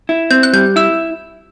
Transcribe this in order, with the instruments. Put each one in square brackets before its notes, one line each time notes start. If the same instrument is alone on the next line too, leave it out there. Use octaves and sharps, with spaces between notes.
[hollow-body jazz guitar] E4
[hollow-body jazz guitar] C4 [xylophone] G6
[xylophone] F#6
[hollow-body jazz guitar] G3 [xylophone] G6
[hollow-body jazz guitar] E4 [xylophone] E6